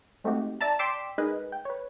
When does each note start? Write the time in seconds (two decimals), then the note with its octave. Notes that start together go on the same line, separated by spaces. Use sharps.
0.24 G#3 A3 C4 D#4 F#4 G4
0.61 D5 E5 A5 A#5
0.79 D5 G5 C6 D6 E6 B6
1.18 G#3 D#4 G#4 A#4 B4 D#5
1.52 G5
1.65 B4 C#5